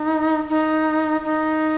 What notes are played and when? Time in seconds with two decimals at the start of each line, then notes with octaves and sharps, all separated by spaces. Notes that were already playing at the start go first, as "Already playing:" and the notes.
Already playing: D#4
0.50 D#4
1.25 D#4